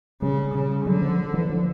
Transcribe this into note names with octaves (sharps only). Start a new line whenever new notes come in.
C#3 G3
C#3
D3 F#3
F3
E3
F3